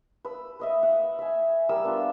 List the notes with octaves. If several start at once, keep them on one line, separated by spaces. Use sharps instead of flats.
B4 E6
B4 D#5 E5
E5 F#5
E5 G#5
G3 A#4 E6
B3 D4 F4